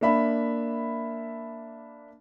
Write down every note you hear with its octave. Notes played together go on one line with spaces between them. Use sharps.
A#3 D4 E5 B5